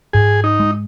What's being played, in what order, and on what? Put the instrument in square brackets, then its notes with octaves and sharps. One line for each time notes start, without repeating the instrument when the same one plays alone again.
[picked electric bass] G#2 [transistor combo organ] G#4
[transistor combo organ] D#4
[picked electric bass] G#3